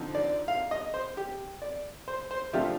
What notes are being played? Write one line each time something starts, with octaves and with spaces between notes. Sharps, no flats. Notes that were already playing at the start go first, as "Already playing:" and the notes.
Already playing: D3 F3 C4 D#4
D5
F5
D#5
C5
G4
D5
C5
C5
C3 F3 A3 D4 F4 G4